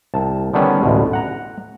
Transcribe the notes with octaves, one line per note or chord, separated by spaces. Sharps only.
C2 A5
D3 D#3 G3 B3 C#4
A1 D2 B2 G#3
F#5 A#5